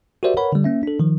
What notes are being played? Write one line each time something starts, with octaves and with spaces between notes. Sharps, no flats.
F#4 G4 A#4 C5 D5 E5
A#4 B4 C#5 F#5 B5
D3 G3
A#3 C#4 E5
D4 A4
D#3 F3